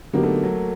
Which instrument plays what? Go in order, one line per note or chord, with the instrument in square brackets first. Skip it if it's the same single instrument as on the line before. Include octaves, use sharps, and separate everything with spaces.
[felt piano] D3 F#3 B3 D#4 G4 [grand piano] A#3
[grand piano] A3
F#3